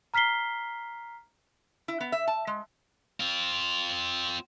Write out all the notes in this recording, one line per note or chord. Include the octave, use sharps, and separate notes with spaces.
A#5 F6 B6 C7 G7
E4
B3
E5
A5
G#3
C4 F4